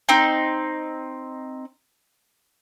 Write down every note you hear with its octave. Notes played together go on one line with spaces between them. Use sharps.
C4 D#4